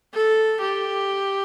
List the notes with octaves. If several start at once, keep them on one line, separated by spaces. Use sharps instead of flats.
A4
G4